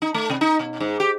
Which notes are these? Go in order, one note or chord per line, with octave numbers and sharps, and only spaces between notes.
D#4
A3
C3
D#4
B2
G#2
G4